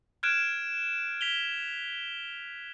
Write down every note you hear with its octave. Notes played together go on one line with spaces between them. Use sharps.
F6 F#6 G#6 D7 E7
B6 F7 G7